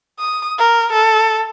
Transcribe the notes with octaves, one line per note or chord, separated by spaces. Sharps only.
D#6
A#4
A4